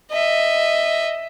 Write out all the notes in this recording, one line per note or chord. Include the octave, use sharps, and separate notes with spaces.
D#5 E5